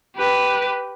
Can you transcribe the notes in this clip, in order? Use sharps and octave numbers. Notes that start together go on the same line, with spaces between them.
G4 B4